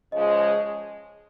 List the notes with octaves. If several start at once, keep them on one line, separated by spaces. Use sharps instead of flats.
C#3 F3 G#3 D#5
D#5